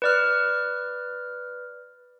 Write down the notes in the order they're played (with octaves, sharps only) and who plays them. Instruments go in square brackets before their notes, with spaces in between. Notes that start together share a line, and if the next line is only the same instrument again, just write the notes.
[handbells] B4 D5 F6